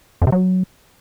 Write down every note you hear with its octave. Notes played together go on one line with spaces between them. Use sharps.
F2
C3
F#3